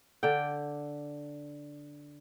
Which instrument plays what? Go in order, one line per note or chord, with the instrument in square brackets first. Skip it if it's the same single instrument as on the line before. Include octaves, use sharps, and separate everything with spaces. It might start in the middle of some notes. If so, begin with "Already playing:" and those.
[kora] D3 D5 G5